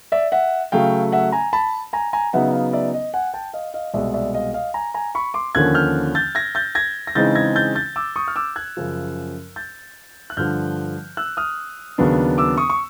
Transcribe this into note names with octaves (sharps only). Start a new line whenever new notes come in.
D5 E5
E5 F#5
C#3 F#3 A3 F5 G5
E5 F#5
G#5 A#5
A5 B5
G#5 A#5
G#5 A#5
C#3 F#3 B3 D#4 E5 F#5
D#5 F5
D5 E5
D#5
F#5 G#5
G5 A5
D#5 F5
D#5 F5
C2 B2 G#3 D5 E5
D5 E5
D#5 F5
D#5 F5
G#5 A#5
G#5 A#5
B5 C#6
C6 D6
D#2 D3 F3 A#3 C#4 F#6 G#6
F6 G6
G6 A6
G#6 A#6
G6 A6
G#6 A#6
A#6
C#3 E3 G#3 C4 D#4 G6 A6
G#6 A#6
G6 A6
G6 A6
D6 E6
C#6 D#6
F6
D6 E6
F#6 G#6
F#2 C#3 F3
G6 A6
F#6
G2 D3 F3 F6 G6
E6 F#6
D#6 F6
D#2 C#3 F#3 B3 D4
D6 E6
C#6 D#6
C#6